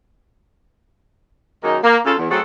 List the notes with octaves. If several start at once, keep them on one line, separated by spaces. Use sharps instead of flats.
F#2 D#3 G#3 A#3 D#4
A#3
C#3 F4 A4
E2
F#3 A3 C4 F#4 G#4 A4